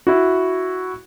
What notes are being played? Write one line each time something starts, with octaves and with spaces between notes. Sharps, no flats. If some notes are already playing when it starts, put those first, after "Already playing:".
E4 F#4